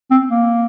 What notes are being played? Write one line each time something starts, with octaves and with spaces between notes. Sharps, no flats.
C4
A#3